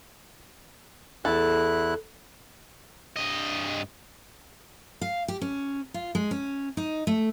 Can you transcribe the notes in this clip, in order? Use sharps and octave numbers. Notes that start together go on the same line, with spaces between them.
E2 E4 A4 F#6
G2 D#5
F5
G4
C#4
F4
G#3
C#4
D#4
A3